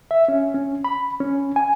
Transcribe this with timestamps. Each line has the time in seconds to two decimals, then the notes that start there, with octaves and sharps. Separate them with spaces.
0.11 E5
0.28 C#4
0.54 C#4
0.84 B5
1.20 C#4
1.56 G#5